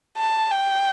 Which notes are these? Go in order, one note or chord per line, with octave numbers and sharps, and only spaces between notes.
A5
G5